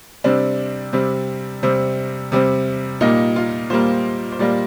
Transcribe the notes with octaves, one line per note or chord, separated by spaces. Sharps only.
C3 G3 C4 D4
C3 G3 C4
C3 G3 C4
C3 G3 C4
A#2 G3 A#3 D#4
F4
A#2 G3 A#3 C5
C5
A#2 G3 A#3 D5